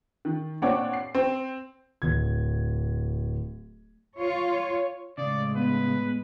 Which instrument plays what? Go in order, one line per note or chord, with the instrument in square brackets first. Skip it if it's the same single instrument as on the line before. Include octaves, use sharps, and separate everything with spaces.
[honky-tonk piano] D#3
A#2 C4 D4 C#5 F#5 D6
C7
C4
[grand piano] D1 G#6
[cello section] F4 C#5
[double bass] A2 G#3 [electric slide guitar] C#3 [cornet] D5
[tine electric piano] B3 [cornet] B4